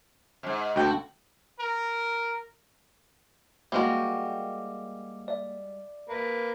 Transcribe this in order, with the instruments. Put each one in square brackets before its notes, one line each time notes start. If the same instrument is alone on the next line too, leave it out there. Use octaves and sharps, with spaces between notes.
[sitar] F2 G#2
[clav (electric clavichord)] D2 G5 [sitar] F#4 A4
[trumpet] A#4
[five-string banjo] G3 G#3 F#4 [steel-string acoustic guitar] A#3 G5 [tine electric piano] D6
[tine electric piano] D5 E5
[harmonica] A#3 B4